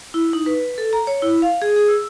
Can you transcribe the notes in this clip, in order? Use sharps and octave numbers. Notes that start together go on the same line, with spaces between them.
E4
D#4
B4
A4
A#5
C#5
E4
F5
G#4
G#4
E6